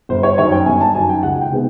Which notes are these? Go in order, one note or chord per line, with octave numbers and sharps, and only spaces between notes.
G1 C5
C#5
F#2 D#3 C#5
G5
G1 G#5
A5
F#2 D#3 G#5
G5
C#2 F#5
G5
C3 D#3 G#3 B3